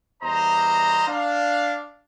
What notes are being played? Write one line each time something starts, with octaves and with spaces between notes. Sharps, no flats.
E2 G3 C5 D#5 A#5
D4 F5